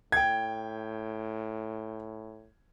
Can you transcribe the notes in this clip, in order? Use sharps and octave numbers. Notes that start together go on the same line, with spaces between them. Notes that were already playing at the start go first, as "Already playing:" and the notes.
A2 G5 G#6